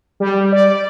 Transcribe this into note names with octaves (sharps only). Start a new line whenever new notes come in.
G3
D5